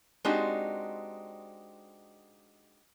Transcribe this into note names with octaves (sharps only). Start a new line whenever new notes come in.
G#3 C4 D4 D#4 F#4 G4